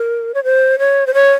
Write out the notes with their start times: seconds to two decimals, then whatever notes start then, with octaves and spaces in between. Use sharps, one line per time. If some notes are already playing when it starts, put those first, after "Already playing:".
Already playing: A#4
0.34 C#5
0.44 C5
0.79 C#5
1.07 C5
1.14 C#5